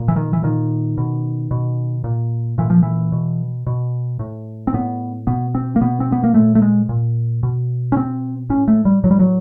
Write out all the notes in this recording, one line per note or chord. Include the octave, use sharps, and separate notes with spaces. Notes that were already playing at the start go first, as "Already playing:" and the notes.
Already playing: A#2
E3
D#3
E3
A#2 D#3
B2
B2
A#2
A#2 E3
F3
E3
B2
B2
A2
C4
A2 B3
B2 B3
C4
A#3
B2 B3
C4
B3
A#3
A#2 A3
A3
G#3
A#2
B2
C#4
B2 C4
A2 C#4
A3
G3
A2 F#3
G3
F#3